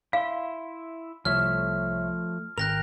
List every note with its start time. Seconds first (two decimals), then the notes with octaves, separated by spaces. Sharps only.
0.13 E4 E5 F5 C6
1.25 C2 F3 A3 C#5 E5 F6
2.58 G#1 A#4 G5 F#6 A#6 F7